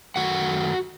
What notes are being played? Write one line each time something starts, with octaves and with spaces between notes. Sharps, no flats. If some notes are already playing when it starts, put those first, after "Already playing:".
F#2 D#3 A3 F#4 F#5